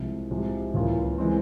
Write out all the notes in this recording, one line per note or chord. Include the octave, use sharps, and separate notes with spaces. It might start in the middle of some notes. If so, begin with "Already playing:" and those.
Already playing: C2 C3 F3 G#3
C2 C3 F3 G#3 C4
C#2 C#3 E3 A#3 F4
E3 G#3 C4